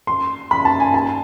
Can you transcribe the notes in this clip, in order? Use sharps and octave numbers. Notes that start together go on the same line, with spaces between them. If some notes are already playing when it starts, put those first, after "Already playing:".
C6
B5
A5
G#5
A5